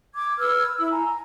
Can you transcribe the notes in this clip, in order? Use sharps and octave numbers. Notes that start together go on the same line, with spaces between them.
D6 G#6
B4 E6 F6 G#6
E4 E6
G#5 A#5